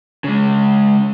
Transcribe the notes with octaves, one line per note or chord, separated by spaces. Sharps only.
C#3 G#3